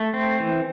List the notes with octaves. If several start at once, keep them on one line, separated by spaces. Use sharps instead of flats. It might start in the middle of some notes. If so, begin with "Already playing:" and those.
Already playing: A3
C4
E3